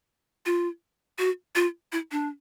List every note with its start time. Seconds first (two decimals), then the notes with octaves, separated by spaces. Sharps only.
0.46 F4
1.18 F#4
1.55 F4
1.92 E4
2.11 D4